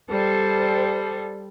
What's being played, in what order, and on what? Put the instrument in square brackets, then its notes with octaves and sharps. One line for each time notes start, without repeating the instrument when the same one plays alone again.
[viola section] G3 [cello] A4 C5